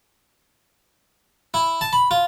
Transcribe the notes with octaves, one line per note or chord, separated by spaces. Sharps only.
E4
A5
B5
F4